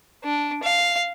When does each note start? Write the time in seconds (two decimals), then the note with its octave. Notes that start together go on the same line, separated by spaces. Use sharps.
0.24 D4
0.63 F5